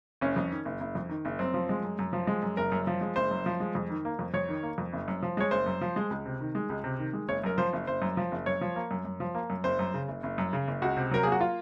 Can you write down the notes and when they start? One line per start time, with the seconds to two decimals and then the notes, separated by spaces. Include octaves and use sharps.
0.21 F#1 C#4
0.36 F2
0.51 D#3
0.65 F#1
0.80 F#1
0.95 F2
1.09 D#3
1.25 F#1
1.39 F#2 C4
1.54 F3
1.69 G#3
1.83 F#2
1.99 F#2
2.13 F3
2.27 G#3
2.43 F#2
2.57 F#1 A#4
2.72 F#2
2.87 F3
3.01 G#3
3.16 F#1 C5
3.31 F#2
3.46 F3
3.60 G#3
3.75 F2
3.90 D#3
4.05 A#3
4.19 F2
4.34 F2 C#5
4.49 D#3
4.63 A#3
4.78 F2
4.93 F#1
5.08 F#2
5.22 F3
5.37 G#3 C#5
5.51 F#1 C5
5.66 F#2
5.81 F3
5.96 G#3
6.10 C#2
6.26 C3
6.40 D#3
6.55 G#3
6.69 C#2
6.84 C3
6.99 D#3
7.13 G#3
7.28 F#1 C#5
7.44 F#2 A#4
7.58 F3 C5
7.73 F#1
7.87 F#1 C5
8.02 F#2
8.17 F3
8.32 F#1
8.46 F#2 C#5
8.61 F3
8.76 A#3
8.91 F#2
9.05 F#2
9.20 F3
9.35 A#3
9.50 F#2
9.64 F#1 C5
9.79 F#2
9.94 C#3
10.08 F#1
10.23 F#1
10.38 F#2
10.53 C#3
10.68 F#1
10.82 C#2 F#4
10.97 C3
11.11 F#3 A#4
11.23 A#3 G#4
11.32 F#4
11.41 F4